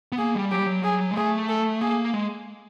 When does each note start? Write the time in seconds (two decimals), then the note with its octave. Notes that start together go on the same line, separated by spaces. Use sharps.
0.12 B3
0.18 A#3 G#4
0.35 G3
0.51 F#3 G4
0.59 G3
0.66 F#3
0.84 G#4
1.11 G#3
1.16 A3 G#4
1.49 A4
1.81 A#3 G#4
2.14 G#3